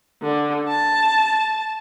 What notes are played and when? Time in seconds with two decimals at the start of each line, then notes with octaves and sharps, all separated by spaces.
0.22 D3
0.69 A5